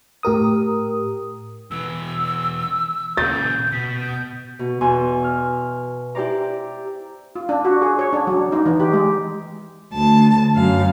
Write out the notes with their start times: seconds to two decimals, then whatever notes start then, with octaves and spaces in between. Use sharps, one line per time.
0.23 A2 G4 A#4 D#6
1.71 B2 E3 E6
3.17 A#2 C#3 G6 A6
3.72 B2 B6
4.00 G6
4.59 B2
4.81 E2 B2 G#5 C6 E6
5.24 F6
6.15 E4 G4 C5 D5 A#5
7.36 F4
7.49 D4
7.65 F#4
7.82 G#4
7.99 C#5
8.13 D4
8.27 F#3
8.52 D#4
8.66 E3
8.80 G4
8.93 G#3
9.92 D2 A5
10.54 F#2 F5